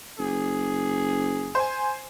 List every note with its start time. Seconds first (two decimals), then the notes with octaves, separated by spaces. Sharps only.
0.19 F#1 G#4
1.55 C5 G#5